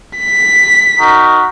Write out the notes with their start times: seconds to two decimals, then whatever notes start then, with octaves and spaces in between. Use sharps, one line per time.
0.18 B6
0.99 D#4 F#4 A#4